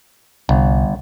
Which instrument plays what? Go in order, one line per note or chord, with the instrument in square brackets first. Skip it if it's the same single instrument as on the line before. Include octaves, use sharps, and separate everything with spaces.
[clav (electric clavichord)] G1 [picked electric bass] C2